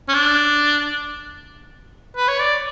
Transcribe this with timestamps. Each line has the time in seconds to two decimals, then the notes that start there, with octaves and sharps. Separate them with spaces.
0.08 C#4
0.14 D4
2.16 B4
2.28 C#5
2.41 D5